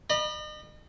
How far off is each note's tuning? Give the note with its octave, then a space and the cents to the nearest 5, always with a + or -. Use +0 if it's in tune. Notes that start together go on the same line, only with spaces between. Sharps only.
D#5 -40 B5 -30